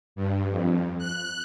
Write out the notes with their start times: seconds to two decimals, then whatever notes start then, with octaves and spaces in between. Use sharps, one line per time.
0.16 G2
0.50 F2
0.98 F#6